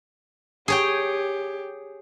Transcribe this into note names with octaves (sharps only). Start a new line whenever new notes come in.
G4 G#4 C#5 G5